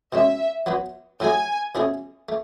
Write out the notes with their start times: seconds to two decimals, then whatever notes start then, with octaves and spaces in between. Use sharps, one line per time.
0.12 B2 G#3 C#4 E5
0.66 F#3 B3 F#4 B4
1.20 A2 F#3 A3 E4 G#4 G#5
1.75 B2 A3 C#4 E4 G#4
2.29 A3